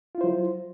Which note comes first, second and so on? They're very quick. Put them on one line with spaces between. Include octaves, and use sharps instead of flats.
F4 E4 C5 F#3